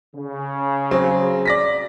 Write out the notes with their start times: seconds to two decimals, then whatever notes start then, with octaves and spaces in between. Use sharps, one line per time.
0.16 C#3
0.91 F#3 C4
1.46 D5 A#6 B6